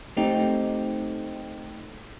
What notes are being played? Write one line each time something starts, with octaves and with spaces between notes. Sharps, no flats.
A3 C4 D#4 G4